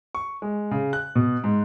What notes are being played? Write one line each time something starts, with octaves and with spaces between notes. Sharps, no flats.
C#6
G#3
C#3
F#6
B2
G#2